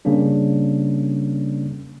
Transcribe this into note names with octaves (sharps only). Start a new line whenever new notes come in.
C#3 G3 A#3 C#4 D4